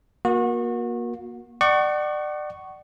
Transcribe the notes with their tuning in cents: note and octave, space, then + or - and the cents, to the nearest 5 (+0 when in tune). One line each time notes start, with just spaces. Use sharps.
A#3 +25 F#4 -30
D5 +30 F#5 +35 C#6 +0